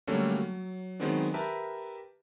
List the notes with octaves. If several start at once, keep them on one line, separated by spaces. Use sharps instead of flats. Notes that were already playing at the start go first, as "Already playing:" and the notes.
D3 F#3 G3 A3 A#3 C#4
F#3
D#3 F#3 G#3 B3 C4 D4
G4 A#4 B4 E5 A5